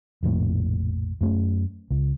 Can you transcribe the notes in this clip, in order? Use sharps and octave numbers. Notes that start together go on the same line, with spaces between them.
F1 A#1 F2 A2
F#2 A3 C#4
C#2